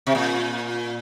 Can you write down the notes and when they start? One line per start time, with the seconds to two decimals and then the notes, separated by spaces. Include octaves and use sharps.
0.07 C3
0.15 A#2